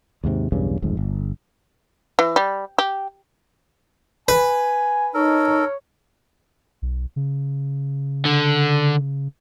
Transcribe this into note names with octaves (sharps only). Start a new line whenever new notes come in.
D#2 G#2 C3
B1 E2 G2 C#3
D1 G#1 F2 G#2
G1
E3
G3
G4
B4 G#5
D#4 A4 A#4 C#5
B1
C#3
D3